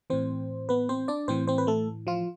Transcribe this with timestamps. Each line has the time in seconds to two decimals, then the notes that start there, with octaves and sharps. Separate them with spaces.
0.10 A2 E3 C4 C5
0.69 B3 B4
0.89 C4 C5
1.08 D4 D5
1.28 A2 E3 C4 C5
1.47 C4 C5
1.58 B4
1.67 A3 A4
2.07 F3 F4